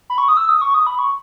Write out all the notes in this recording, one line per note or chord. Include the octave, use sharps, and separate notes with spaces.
B5
C#6
D#6
E6
D#6
C#6
D#6
B5
C#6